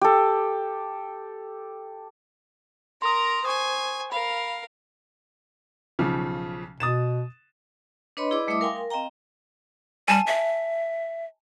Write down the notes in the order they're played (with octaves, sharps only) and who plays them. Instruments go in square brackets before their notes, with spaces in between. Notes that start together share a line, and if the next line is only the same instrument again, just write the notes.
[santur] G4 A4
[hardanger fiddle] A#4 A#5 [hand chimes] C6 D#6
[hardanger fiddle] C5 G#5 [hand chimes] C#6 D#6
[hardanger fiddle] A#4 F5 [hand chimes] B5
[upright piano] B1 C#3 F3
[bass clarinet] B2 [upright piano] D#6 A6 E7
[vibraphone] D4 B4 C#5 D#5 B5 C6
E4 G#4 B4 D5 D#5 D6
G3 A3 E4 E5 D6 D#6
A#4 F5 G5 G#5 C6
A#4
C4 D#5 F5 G5 A#5
[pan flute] G3 [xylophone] G#5 A5
[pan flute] E5